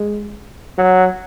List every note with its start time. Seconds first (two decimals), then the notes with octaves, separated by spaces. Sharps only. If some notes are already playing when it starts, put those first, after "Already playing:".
Already playing: G#3
0.78 F#3